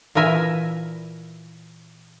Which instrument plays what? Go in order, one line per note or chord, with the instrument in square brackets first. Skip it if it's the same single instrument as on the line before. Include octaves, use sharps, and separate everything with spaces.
[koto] A#2 E3 A#4 E5 G#5